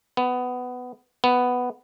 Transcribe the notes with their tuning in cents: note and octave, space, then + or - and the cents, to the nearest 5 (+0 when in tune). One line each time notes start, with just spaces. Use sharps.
B3 +15
B3 +5